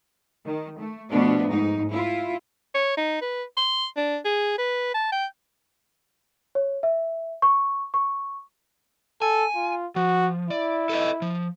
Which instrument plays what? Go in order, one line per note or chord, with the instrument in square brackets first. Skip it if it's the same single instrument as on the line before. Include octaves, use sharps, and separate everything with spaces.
[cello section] D#3
A3
B2 F3 A3 B3 D4
G#2 D#4
E4 F4
[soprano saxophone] C#5
D#4
B4
C6
D4
G#4
B4
A5
G5
[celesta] C#5
E5
C#6
C#6
[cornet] A4 [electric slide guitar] G#5
[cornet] F4
[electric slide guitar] F3 [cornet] F#4
[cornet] E4 [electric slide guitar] D5
[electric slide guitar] A4 B4 D#5
F3